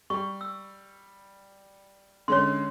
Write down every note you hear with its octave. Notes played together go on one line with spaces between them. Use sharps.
G3 C#6
E6
D3 G#3 C#4 C#5 C6